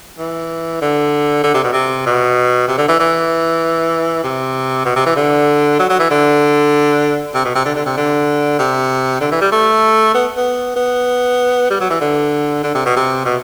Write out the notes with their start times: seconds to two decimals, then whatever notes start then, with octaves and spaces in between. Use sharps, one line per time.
0.19 E3
0.81 D3
1.44 D3
1.54 C3
1.63 B2
1.73 C3
2.06 B2
2.68 C3
2.78 D3
2.88 E3
3.00 E3
4.24 C3
4.86 B2
4.96 C3
5.06 E3
5.16 D3
5.79 F#3
5.90 F#3
6.00 E3
6.11 D3
7.34 C3
7.45 B2
7.55 C3
7.65 D3
7.76 D3
7.86 C3
7.97 D3
8.59 C3
9.21 D3
9.32 E3
9.41 G3
9.52 A3
10.14 B3
10.37 B3
10.76 B3
11.70 G3
11.81 F#3
11.90 E3
12.01 D3
12.63 D3
12.75 C3
12.86 B2
12.97 C3
13.25 B2